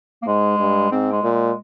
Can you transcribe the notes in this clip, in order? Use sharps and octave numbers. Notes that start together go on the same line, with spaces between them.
A#3
G#2 G#3
G2
G#2 C4
G#3
A#2
G#3